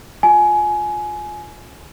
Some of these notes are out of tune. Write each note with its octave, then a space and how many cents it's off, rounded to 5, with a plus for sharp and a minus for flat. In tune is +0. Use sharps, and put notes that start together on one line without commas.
F4 +15 G#5 +20